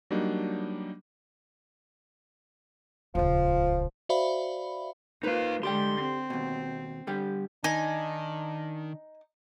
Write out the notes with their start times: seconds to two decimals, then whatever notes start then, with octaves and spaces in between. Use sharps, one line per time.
0.11 F#3 G3 A#3 D4 D#4
3.15 D#1 C#2 F3
4.09 F#4 C5 D5 E5 F5 B5
5.23 A#3 D#4 F4 B4 C5 F5
5.63 D3 G#3 G4 D5 G5 C6
5.99 C4
6.30 D#2 B2
7.07 D3 G3 G4
7.64 D#3 D4 D#4 G#5